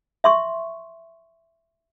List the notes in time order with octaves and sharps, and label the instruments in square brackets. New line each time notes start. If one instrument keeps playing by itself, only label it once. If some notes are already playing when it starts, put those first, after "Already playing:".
[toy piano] E5 C6 C#6